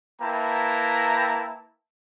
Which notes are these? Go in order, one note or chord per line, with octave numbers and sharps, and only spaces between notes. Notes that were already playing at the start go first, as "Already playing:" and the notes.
A#3 E4 B4 G5 A5 A#5